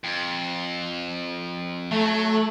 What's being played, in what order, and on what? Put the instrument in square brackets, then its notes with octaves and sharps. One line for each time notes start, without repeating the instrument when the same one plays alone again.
[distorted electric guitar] F2
[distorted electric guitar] F#3 [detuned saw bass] A3